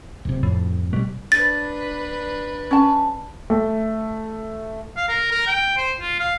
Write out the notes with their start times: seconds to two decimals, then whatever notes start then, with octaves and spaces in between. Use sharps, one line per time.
0.25 D1 C3
0.43 F2 A2
0.93 B2 G3 A#3
1.32 D4 B4 A6
2.71 C#4 A5
3.50 A3
4.97 F5
5.09 A#4
5.31 A#4
5.47 G5
5.77 C5
6.00 F4
6.20 F5